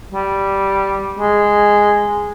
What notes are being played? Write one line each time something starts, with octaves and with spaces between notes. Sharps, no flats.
G3
G#3